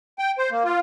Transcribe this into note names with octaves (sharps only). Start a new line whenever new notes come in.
G5
C5
A#3
F4